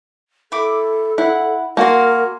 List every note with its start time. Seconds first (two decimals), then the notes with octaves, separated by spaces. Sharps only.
0.52 E4 A4 D6
1.18 E4 F#5
1.77 A#3 F#4 A#4 G#5 C6